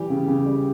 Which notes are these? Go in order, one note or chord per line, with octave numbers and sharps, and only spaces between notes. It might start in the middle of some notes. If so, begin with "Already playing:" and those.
Already playing: E3 G3 G4
C#3
C#3
G3